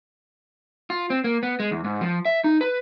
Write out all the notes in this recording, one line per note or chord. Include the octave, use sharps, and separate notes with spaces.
F4
C4
A#3
B3
G#3
E2
G#2
F3
E5
D#4
B4